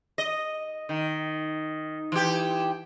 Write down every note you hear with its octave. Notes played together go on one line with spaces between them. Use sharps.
D#5
D#3
E3 G4